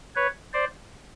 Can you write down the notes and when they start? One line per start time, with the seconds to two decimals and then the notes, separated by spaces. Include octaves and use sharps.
0.16 B4 C#5
0.53 C5 D5